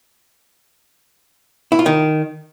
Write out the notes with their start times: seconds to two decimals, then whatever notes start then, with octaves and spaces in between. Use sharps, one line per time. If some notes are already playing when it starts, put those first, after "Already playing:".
1.72 E4
1.79 F4
1.86 D#3